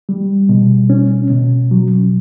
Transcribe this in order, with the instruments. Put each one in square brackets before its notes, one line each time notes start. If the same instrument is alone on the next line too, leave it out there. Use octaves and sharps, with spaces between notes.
[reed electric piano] G3
B2
C#4
B2
F#3